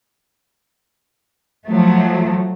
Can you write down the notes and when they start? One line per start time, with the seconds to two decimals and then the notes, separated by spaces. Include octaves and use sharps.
1.67 F3 F#3 A3